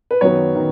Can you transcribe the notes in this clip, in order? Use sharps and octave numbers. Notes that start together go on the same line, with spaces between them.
B4
F#2 D#3 F#3 B3 C#5
D#3